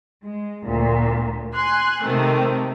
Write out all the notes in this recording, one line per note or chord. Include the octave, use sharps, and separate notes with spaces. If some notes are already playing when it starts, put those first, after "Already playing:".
G#3
D2 A#2
G#5 C6 F#6
C3 D#3 A3 C4